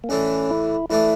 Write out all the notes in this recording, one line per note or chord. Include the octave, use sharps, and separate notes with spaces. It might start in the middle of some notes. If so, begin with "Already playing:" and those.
A#3
A2 E3 A3 C#4 D4
E4
A2 E3 A3 D4 E4